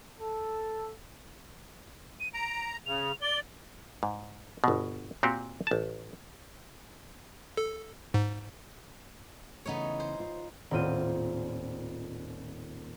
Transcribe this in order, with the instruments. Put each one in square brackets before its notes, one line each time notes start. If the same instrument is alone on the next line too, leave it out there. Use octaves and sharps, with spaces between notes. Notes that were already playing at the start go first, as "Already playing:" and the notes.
[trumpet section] A4
[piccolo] D#7
[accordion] A#5 [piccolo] D7
[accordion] C#3 [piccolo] F7
[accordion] D5 [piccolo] G7
[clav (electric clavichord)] G#2
G1 B2
A#2 C4 F#4 G4
A1 A5
[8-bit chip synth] A4
G#2
[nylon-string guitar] C#3 E3 A3 [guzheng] B3 D#4 C#5
[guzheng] C5
[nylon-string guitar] F4
[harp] D#1 A2 C4 F4 D#7